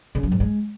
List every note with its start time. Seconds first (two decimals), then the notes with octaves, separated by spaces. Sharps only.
0.15 C#3
0.23 F#3
0.32 G#2
0.40 G#3